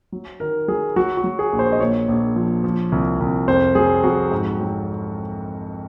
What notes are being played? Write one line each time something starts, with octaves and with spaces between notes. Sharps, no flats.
F#3
D#3 A#4
F#3 G#4
F#3 F#4
F#4
F#3
G#4
A#1
C5
D#5
A#2 C#5
A#1
F3
F3
C2
C2
F2 C5
F#3 G#4
F2 F#4
G#2
F#3